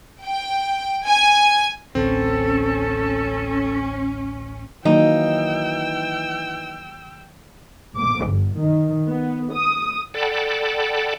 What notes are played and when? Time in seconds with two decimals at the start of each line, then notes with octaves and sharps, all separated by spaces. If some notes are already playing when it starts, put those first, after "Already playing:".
0.24 G5
1.06 G#5
1.95 A1 D2 C4 C#4 A4
4.85 D#3 E3 F#3 A#3 D#4 G5 E6
7.96 D6
8.27 G1
8.56 D#3
9.08 B3
9.53 D#6
10.14 A4 D5 F#5 G5 A5 B5